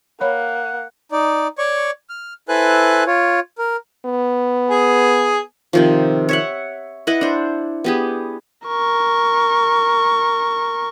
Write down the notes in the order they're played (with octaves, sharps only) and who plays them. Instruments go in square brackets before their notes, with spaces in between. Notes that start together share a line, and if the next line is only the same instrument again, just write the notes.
[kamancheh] A#3 [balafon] C#5 B5 [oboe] F#5
[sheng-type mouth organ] D#4 D5
C#5 D5 C#6
F6
E4 A4 B4 C5 G#5 F#6
F4 C#5
A#4
[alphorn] B3
[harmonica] G#4
[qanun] C3 D#3 F3
C#5 E5 F#5
E4 B4 D#5 F#5
D4 C5
B3 G4 G#4
[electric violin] A#4 C#6